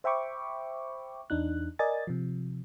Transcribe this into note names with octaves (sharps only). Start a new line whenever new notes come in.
C5 E5 G5 B5 C#6 D6
E2 D4 D#4 F#6
A#4 D5 D#5 G#5 A6
C3 F3